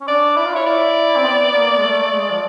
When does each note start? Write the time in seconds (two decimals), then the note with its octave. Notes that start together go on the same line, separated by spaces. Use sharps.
0.01 C#4
0.07 D4 D5
0.37 E4 D5
0.45 F4
0.53 E4 C#5
0.66 D5
1.16 C4
1.24 B3
1.54 A#3
1.78 G#3
1.83 A3
2.03 A3
2.12 G#3
2.30 F3